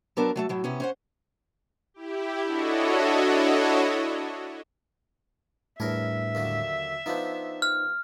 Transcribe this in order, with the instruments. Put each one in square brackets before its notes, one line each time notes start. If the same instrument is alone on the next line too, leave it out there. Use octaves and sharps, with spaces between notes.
[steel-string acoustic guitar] F#3 B3 D4 A4 A#4 A5
F#3 A3 A4
A2 F#3 E4
C3 B3 C#4
C#4 C5 F#5
[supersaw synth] E4 G4
D4 E4 F#4 A4 C#5 D#5
[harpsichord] E2 A#4 C#5 [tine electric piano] A2 G3 D4 [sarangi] E5
[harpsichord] D#2 D3 F#3
[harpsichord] F3 B3 D4 [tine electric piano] D#4 C5
[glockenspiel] F6